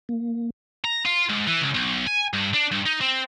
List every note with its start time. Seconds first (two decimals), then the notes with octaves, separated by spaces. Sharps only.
0.09 A#3
0.84 A#5
1.05 F4
1.29 G#2
1.47 E3
1.61 C#2
1.74 B1
2.07 G#5
2.33 G2
2.54 D4
2.71 G2
2.86 D#4
3.01 C4